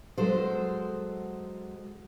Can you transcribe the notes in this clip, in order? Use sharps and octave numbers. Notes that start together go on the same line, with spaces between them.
F#3 G#3 A4 C5